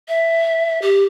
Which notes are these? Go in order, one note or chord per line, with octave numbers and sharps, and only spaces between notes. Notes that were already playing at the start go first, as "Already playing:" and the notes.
E5
G4